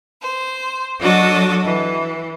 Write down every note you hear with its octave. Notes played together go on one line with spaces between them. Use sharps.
C5
F#3 D4 F#4 A4 D#5
E3